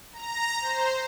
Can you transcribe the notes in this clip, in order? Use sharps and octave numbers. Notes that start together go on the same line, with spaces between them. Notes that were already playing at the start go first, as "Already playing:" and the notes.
A#5
C5